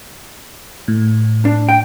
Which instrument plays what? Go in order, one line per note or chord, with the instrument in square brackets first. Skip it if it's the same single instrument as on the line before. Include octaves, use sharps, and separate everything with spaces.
[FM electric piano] A2
[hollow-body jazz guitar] D4
G5